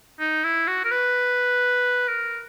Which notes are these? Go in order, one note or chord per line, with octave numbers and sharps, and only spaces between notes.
D#4
E4
F#4
A#4
B4
A#4